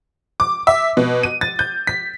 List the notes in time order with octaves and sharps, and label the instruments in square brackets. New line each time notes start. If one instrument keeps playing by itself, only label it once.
[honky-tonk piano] D6
E5
B2
D#7
A6
G6
B6